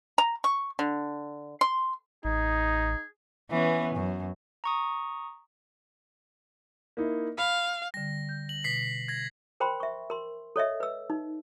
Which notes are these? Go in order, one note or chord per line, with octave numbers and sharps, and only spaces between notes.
A#5
C#6
D3
C6
A1 D#4 G#4
E3 B3 C#4
F#2
A#5 C#6 D#6
A#3 D#4 E4
F5 B5
D3 G3 A#6
G6
F#7
B2 B6 C7
G#6 A#6
A#4 C5 G5 B5 C6
E5 C#6
A#4 C6
A4 C#5 D#5 E5
B4 E6
D#4